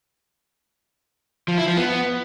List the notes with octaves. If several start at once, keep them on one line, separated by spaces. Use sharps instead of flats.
F3
E4
F3
B3